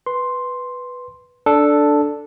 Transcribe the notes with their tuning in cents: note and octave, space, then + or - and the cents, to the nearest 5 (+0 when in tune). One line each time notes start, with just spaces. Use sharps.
B4 +0 C6 +0
D4 +0 A4 +0